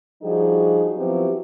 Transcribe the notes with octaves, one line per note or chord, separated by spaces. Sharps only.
F3 G3 D4 D#4 F#4 G#4
F3 F#3 B3 C4 E4 G4